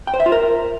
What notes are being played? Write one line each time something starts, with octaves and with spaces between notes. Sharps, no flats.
G5
C5
E5
F4
A#4